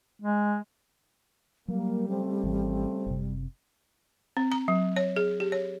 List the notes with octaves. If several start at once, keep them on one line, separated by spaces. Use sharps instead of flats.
G#3
F#3 G3 A#3
C#3 A3 C4
G#1 D#3 E3
F#1 C3
C4
A#5
F#3
C#5
G#4
G4
C#5